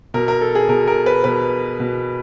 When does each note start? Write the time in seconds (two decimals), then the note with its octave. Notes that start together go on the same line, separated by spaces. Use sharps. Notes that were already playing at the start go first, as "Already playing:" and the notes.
0.14 B2 A#4
0.28 A#4
0.41 A4
0.55 G#4
0.69 B2 A#4
0.87 A#4
1.06 B4
1.24 B2 B4
1.80 B2